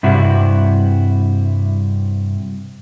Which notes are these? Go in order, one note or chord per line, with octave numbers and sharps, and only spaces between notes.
G2 C3 E4 F#4